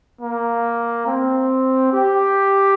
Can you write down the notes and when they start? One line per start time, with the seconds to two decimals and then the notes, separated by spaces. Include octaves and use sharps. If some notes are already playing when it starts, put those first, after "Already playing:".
0.21 A#3
1.07 C4
1.93 G4